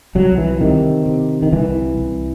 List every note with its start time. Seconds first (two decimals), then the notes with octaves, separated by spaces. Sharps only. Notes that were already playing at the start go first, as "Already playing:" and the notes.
0.15 C2 F#3
0.38 E3
0.61 C3 D#3
1.06 C3
1.42 D#3
1.52 C2 E3
1.98 C2